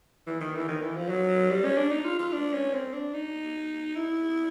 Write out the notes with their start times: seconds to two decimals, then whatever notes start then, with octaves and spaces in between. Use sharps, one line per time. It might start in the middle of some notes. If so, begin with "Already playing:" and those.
0.27 E3
0.41 D#3
0.55 E3
0.68 D#3
0.82 E3
0.97 F3
1.09 F#3
1.50 G3
1.65 C#4
1.78 D4
1.91 D#4
2.05 F4
2.19 F4
2.33 D4
2.54 C#4
2.74 C4
2.93 D4
3.14 D#4
3.97 E4